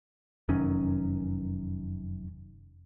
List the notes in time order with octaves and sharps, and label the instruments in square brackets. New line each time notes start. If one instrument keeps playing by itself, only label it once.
[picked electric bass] F1 F#2 D#3 C#4